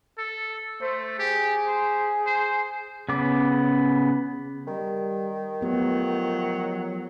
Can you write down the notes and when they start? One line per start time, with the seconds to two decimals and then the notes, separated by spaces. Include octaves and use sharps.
0.18 A4
0.81 A3 C5
1.19 G4 G#4
1.67 C5
2.26 C5
3.09 C#3 B3 D6
4.67 D#3 G3
5.61 F3 F#3 A3 B3 G4